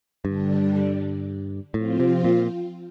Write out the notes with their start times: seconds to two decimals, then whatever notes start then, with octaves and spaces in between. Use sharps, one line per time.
0.25 G2 D3 G3 D4
1.74 A2 F3 C4 F4
2.00 C3
2.24 A#2